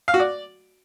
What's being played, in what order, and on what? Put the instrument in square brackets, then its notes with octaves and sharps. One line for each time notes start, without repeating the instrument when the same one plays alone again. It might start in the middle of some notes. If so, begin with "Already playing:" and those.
[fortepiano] F5
F#4
D5